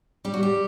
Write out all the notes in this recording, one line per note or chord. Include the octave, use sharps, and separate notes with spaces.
G3 G4
F#4
G4